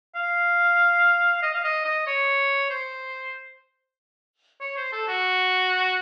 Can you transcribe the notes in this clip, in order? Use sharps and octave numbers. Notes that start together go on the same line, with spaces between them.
F5
D#5
F5
D#5
D#5
C#5
C5
C#5
C5
A4
F#4